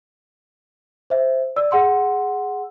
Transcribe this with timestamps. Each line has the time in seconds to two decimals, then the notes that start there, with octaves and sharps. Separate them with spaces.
1.10 C5 E5
1.56 D5 E6
1.71 G#4 F#5 C6 E6